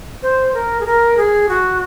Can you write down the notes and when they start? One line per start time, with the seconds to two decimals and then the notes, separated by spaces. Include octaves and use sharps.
0.23 C5
0.54 A#4
0.81 G#4
0.86 A#4
1.17 G#4
1.49 F#4